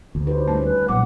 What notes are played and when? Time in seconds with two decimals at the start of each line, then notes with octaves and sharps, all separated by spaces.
0.15 D2
0.27 D#4 G4 B4 C5
0.48 G3 A3 C#4
0.65 B4
0.88 B1 A#2 F3 F#5 D6